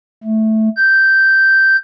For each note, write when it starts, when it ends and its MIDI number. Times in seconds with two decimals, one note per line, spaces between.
0.24 0.69 57
0.77 1.76 91